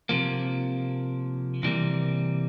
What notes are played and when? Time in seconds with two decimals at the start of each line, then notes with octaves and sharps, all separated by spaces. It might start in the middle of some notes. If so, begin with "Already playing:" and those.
0.09 C3 F3 A#3
1.63 C3 E3 G3 A#3